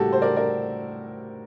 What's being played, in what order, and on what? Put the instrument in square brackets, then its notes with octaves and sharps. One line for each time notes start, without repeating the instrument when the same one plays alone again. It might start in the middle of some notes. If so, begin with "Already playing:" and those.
Already playing: [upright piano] A2 G3 A#3 F#4 G4 A4
C5
A#4 D5
A#4 D5